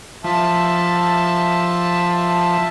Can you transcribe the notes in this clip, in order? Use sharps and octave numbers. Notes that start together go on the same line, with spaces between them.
F3 E5 A5